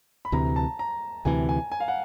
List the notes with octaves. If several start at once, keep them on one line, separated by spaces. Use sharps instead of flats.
B5
D2 C3 E3 A#5
A5
A#5
D2 C3 E3 G#5
G#5
G#5
F5
F#5